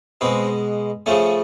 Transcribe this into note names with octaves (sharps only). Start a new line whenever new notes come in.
B2 G#3 C4
C#3 F3 A3 C#4